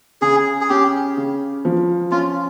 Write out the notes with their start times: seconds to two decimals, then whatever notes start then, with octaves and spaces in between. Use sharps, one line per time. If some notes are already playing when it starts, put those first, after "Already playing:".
0.22 C#3 G#4
0.61 G#4
0.69 C#4 G4
1.17 C#3
1.65 F3
2.11 C#4 F4